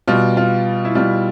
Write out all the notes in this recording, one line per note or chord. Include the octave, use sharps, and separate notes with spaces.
B2 G3 F4
F4
E4
B2 G3 F4